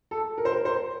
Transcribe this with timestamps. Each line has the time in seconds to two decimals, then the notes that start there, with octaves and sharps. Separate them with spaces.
0.11 A4
0.38 A#4
0.45 C5
0.52 A#4
0.65 C5